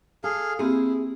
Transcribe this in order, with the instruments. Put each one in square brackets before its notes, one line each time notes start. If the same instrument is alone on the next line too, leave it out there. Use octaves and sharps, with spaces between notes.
[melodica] G#4 F5 [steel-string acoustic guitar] A4
[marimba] A#3 C4 G4 [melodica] E4 [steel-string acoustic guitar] G#4